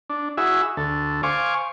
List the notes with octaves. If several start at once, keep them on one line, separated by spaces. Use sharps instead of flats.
D4
E4 F#4 G#4 E5
D2 A4
C5 F5 G#5 C#6 D6